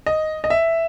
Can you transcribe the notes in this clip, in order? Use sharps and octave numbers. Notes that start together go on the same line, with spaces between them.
D#5
D#5
E5